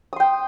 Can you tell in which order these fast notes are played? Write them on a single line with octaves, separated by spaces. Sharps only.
D#6 C6 G5